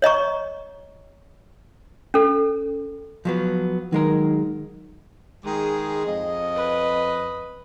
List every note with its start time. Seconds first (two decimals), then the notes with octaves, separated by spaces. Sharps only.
0.02 C#5 D#5 A#5 C#6
2.14 C#4 A4
3.25 F3 F#3 B3
3.92 D#3 F#3 G#3 A#4
5.44 D#3 G#3 G#4
6.06 F2 D#5
6.55 B4